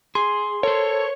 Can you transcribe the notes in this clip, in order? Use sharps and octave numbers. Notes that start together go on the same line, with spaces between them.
G#4 C6
A4 A#4 C5 C#5